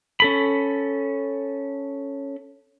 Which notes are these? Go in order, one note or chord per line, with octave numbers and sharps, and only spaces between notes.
C#4 A4 B5